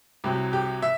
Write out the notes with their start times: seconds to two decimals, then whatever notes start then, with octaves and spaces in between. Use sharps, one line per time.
0.24 C2 C3 F#3 G4
0.53 G4
0.82 E5